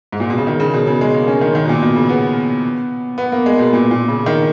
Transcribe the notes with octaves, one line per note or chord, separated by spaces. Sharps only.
G#2
A#2
B2
C#3
D#3
C#3
B2
C#3
G#3
A#3
C#4
D#3
D#3
B2
A#2
B2
C#3
B3
B3
A#3
G#3
B2
A#2
A#2
C#3
D#3